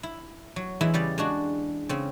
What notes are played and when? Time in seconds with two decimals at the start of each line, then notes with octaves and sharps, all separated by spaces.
0.03 E4
0.56 F#3
0.81 E2 E3 G#3 E4 E5
0.94 C#3 G3 D5
1.18 G#3 D4 F#4
1.89 C#3 C4